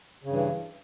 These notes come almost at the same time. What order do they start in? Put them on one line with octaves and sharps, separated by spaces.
C#3 G2 E3